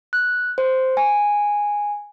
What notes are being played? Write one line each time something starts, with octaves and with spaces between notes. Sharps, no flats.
F#6
C5
G#5